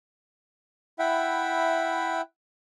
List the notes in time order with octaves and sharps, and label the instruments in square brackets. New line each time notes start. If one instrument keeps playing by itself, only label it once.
[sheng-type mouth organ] E4 E5 F#5 G5 B5